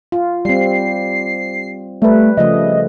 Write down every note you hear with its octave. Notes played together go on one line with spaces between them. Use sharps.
F4
G3 C4 C7
G3 A3 B4
C#3 F3 A3 D#5